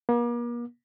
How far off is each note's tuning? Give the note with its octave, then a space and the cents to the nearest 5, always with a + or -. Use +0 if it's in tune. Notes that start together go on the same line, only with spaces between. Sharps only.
A#3 +40